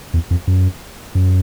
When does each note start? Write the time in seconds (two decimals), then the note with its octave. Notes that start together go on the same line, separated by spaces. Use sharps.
0.14 E2
0.31 F2
0.47 F#2
1.15 F#2